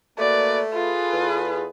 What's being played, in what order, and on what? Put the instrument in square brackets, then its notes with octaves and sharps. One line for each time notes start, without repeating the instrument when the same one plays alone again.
[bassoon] A3 [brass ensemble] A#3 F#4 B4 [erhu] D5
[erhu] F4 [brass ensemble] G#4 A4 B4
[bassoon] E2